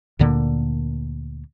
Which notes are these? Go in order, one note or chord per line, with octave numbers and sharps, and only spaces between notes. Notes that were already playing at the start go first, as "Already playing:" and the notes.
D2 A#2 D3 A#3